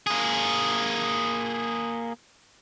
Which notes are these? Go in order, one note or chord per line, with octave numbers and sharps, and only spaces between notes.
A#3 G#4